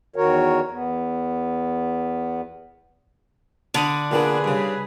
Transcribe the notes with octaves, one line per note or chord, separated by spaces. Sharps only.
E2 D#3 F#4 A#4 C#5
E2 B3
D3 D5 B5 D#6
A#2 B3 D4 G#4 B4
G2 C#3